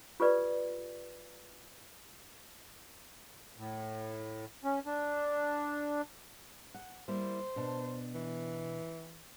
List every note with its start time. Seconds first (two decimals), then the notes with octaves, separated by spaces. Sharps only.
0.20 F4 G4 A4 B4 D5
3.58 A2
4.64 C#4
4.86 D4
6.74 F#5
7.08 G3 A#3 E4 C5
7.56 B2 D4
8.14 E3